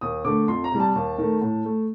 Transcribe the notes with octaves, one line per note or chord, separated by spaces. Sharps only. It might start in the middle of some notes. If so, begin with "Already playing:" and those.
D#2 D#6
D3 A3 D6
F2 C6
A#5
C3 G3
A5
D#2
D#3 A3
A2
A3